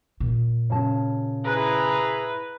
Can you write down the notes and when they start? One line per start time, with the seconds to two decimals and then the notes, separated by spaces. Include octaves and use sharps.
0.20 A#2
0.70 C#3 A5
1.45 E4 G#4 B4 A#5